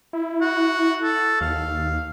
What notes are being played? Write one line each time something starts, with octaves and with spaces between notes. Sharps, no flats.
E4
F#4
A4
D#2 F5